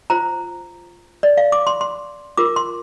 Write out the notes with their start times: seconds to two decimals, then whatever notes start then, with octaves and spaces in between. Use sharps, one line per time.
0.10 F4 C5 A#5
1.23 D5
1.38 F5
1.52 D6
1.67 C6
1.81 C6
2.37 F4 A#4 D6
2.56 C6